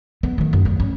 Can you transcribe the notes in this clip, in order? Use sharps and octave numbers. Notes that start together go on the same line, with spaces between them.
B3
D#3 A3
F#2
G2
C#4